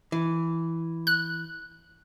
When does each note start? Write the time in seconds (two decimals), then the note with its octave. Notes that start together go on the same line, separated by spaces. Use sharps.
0.12 E3
1.07 F#6